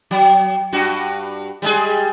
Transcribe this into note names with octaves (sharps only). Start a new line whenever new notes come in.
F#3
G2 F#4
G3 G#3 G#4